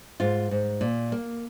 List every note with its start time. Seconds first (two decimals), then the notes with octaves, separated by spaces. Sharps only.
0.20 G#2 F4
0.51 G#2
0.81 A#2
1.12 A#3